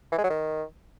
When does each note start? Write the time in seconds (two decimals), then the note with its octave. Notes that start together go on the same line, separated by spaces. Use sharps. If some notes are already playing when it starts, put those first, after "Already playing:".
0.12 E3
0.18 G#3
0.24 F#3
0.30 D#3